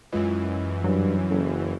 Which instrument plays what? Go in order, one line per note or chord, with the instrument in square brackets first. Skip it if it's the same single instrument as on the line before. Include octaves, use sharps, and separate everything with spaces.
[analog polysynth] F#2 E3 [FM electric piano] G#3 F4 D#5
[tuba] G2 [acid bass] F#3
[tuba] F#1 [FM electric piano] C#4 A4